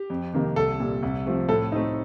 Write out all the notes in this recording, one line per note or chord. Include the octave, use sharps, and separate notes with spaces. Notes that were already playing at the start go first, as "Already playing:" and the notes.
Already playing: G4
F2
C3 D#3 A#3
C2 A4
A#2 G3
C2
C3 F3 A3
A2 A4
A3 C4 D#4